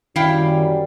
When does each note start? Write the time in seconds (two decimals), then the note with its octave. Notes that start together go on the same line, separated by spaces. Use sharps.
0.16 F#2 D#3 F#3 G3 E4 F5 G5